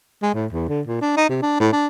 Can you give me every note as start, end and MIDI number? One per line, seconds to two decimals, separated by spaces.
0.23 0.30 56
0.34 0.46 45
0.53 0.67 40
0.69 0.81 50
0.88 1.01 46
1.01 1.12 62
1.17 1.28 63
1.29 1.38 48
1.42 1.59 62
1.60 1.68 45
1.73 1.87 62